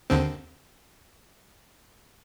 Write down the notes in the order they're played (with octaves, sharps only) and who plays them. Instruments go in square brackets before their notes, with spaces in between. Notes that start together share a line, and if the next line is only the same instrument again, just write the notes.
[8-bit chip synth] D#2 D3 C4